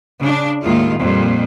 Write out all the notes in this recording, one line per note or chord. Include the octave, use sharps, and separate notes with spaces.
C#3 D4
D#2 A2 D#3 G#3 E4 F4
F2 A#2 G3